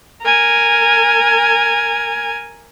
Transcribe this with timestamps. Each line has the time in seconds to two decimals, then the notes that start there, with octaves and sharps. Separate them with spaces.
0.22 A#4 G#5